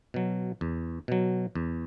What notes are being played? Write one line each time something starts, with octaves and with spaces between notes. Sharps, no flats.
B2 F#3
E2
B2 F#3
E2